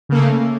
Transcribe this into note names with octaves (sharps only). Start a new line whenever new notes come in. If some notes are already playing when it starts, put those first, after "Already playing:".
C#3 A3 A#3